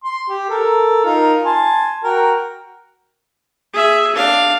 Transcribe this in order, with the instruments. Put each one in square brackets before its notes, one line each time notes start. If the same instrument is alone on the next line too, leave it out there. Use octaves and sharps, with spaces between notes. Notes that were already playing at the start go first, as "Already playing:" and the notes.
[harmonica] C6
G4
A4 A#4
D#4 F4 A#4
G#5 A5 C6
F#4 A#4 G5
[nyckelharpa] G#4 E5
D4 F5